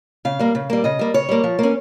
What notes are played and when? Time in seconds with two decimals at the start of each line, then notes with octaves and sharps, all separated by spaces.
0.25 C#3 F5
0.39 G3 A#3
0.55 C#3
0.70 G3 A#3
0.84 C#3 D#5
0.99 G3 A#3
1.14 C#3 C#5
1.29 G3 A#3
1.44 F3
1.59 A#3 C#4